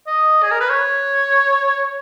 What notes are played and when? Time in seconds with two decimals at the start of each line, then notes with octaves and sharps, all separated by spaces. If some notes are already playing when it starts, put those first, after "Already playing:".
0.07 D#5
0.43 G#4
0.51 A#4
0.60 B4
0.69 C#5